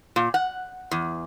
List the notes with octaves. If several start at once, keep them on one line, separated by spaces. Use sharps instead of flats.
A#2
F#5
E2